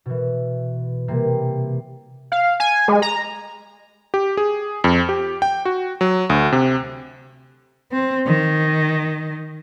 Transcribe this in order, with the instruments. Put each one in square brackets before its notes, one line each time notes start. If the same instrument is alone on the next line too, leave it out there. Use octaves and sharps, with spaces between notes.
[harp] B2 E3
C3 E3 G3 A#3 C4
[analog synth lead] F5
G#5
G#3
A#5
[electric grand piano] G4
G#4
F2
G4
G5
F#4
F#3
D2
C3
[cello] C4
D#3